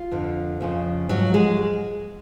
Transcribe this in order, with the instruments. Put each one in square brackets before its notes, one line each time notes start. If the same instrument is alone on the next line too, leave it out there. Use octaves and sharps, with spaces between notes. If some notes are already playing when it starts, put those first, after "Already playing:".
Already playing: [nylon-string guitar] F4
F2 D3 F3
F2 C#3 F3
G#2 F3 F#3 F#4
G#3 G#4